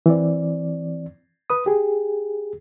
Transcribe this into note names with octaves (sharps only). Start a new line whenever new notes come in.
E3 C4 D5
B4 D#6
G4 G#4